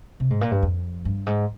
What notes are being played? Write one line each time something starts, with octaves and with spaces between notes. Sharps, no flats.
C3
G#2
A#2
G2
F2
G2
G#2